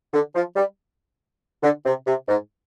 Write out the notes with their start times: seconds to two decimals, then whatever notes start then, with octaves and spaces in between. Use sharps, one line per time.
0.14 D3
0.35 F3
0.56 G3
1.63 D3
1.86 C3
2.07 C3
2.29 G#2